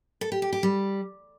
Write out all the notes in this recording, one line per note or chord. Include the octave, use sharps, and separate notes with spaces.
A4
G4
G4
G4
G3